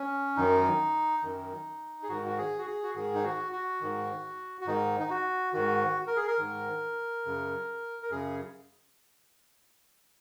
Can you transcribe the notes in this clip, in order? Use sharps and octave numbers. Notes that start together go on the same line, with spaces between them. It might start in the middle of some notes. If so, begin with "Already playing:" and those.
Already playing: C#4
F#2 D#3 D#4
F#2 D#3
G#4
G#2 D#3 F#4
F#4
G#4
F#4
G#4
F#4
G#2 D#3 G#4
D#4
F#4
F#4
G#2 D#3
F#4
G#2 D#3 D#4
D#4
F#4
G#2 D#3 F#4
A#4
G#4
A#4
G#2 D#3
F#2 C#3
A#4
F#2 C#3 G#4